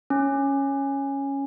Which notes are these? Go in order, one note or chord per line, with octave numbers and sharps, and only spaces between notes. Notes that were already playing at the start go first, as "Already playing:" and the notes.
C#4